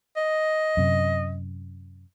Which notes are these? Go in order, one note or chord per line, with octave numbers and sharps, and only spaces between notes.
D#5
F#2 C3